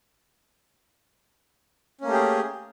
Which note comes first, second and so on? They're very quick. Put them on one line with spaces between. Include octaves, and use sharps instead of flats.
C#4 A#3 A3 G4 G#4